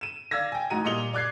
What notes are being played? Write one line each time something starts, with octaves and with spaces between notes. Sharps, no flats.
D#7 E7
D5 F5 E6 G#6 A#6
G5 G#5
A1 D#4 F#4 A#5 D#7
A#2 G3 D#5 C#7 F7 G7
D5 D6 F#6 G#6 C7